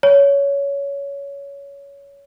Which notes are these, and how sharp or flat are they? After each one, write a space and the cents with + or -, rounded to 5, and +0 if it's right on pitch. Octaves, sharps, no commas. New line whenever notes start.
C#5 +20